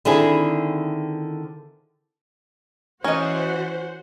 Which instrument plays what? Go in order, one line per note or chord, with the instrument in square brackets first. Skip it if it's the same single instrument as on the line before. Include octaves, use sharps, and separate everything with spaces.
[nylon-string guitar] D3 D#3 C4 E4 G#4
[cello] E3 [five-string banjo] C#4 A#4 [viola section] F#4 C5 F#5 [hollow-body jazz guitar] C#5 D#5